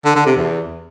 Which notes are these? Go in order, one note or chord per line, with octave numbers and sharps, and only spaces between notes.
D3
D3
C3
E2